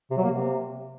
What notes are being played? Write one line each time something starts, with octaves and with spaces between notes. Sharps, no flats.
C3
F#3
A#3
C3